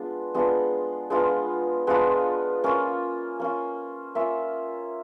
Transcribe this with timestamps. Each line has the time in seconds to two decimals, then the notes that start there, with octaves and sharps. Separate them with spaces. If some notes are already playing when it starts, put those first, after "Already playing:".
Already playing: G#3 B3 D4 F4
0.34 G#3 B3 D4 F4
1.10 G#3 B3 D4 F4
1.87 G#3 B3 D4 F4
2.64 A#3 C#4 F4
3.40 A#3 C#4 F4
4.15 A#3 C#4 F4 E5